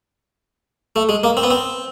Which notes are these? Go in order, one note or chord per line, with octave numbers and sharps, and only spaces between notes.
A3
G#3
A#3
C4
B3
C4